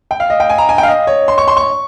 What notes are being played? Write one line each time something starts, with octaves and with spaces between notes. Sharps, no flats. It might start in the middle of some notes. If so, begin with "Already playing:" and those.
G5
F5
D#5
G5
G#5
A#5
G#5
G5
F5
D#5
C#5
C6
C#6
C6
C#6